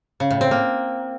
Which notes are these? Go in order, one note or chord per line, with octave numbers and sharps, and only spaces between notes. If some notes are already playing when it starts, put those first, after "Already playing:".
C#3
A2
C4
A#3